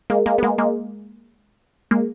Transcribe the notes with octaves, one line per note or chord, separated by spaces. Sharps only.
G#3 A#3
G#3 A#3
B3
G#3 A#3
G#3 A#3
G#3 A#3